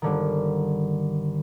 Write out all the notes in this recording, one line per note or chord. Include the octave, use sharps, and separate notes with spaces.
G1 D3 D#3